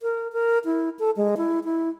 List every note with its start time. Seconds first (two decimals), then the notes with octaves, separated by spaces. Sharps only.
0.02 A#4
0.33 A#4
0.65 E4
0.99 A4
1.17 G#3
1.37 E4
1.64 E4